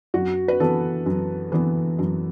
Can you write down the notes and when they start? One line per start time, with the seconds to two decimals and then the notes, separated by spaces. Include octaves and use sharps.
0.14 F#2 F#4
0.48 B4
0.60 E3 B3 A4
1.06 F#2
1.52 E3 B3
1.99 F#2